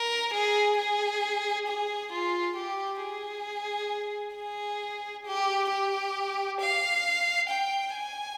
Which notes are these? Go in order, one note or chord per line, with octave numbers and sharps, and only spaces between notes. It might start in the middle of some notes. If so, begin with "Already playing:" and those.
Already playing: A#4
G#4
G#4
G#4
F4
G4
G#4
G#4
G4
G4
F5
G5
G#5